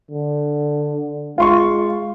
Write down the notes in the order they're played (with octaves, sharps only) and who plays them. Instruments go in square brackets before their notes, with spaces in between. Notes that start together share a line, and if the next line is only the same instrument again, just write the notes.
[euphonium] D3
[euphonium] G#3 [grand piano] F4 C6 C#6